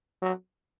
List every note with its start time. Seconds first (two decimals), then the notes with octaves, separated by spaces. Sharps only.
0.22 F#3